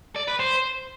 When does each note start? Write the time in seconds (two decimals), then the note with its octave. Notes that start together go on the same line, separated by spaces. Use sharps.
0.16 D5
0.28 B4
0.40 C5